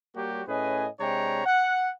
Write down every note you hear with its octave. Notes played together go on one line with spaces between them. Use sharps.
G3 A#3 F#4 G4 C#5
A2 C#4 G#4 B4 D#5 G#5
C3 G#3 D4 C#5 G5 A#5
F#5